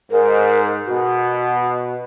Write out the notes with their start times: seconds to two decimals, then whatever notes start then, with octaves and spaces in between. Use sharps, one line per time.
0.11 G#2 A#4
0.87 B2 F#4